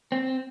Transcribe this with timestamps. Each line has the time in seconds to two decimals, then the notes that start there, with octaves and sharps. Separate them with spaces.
0.12 C4